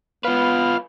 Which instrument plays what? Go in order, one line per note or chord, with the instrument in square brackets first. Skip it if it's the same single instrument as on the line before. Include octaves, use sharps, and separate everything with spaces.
[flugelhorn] B3 [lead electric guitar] F4 B4 [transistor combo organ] F5